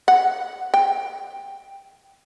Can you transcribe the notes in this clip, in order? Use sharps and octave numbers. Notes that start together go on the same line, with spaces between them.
F#5
G5